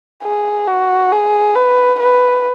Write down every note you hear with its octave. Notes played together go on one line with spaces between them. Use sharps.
G#4
F#4
G#4
B4
B4